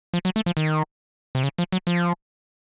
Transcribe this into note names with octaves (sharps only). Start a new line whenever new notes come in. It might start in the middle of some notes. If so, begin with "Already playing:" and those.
F3
F#3
A3
F3
D#3
C3
C#3
F3
F#3
F3